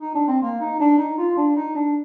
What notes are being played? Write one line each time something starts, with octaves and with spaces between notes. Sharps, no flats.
D#4
D4
C4
A#3
D#4
D4
D#4
F4
D4
D#4
D4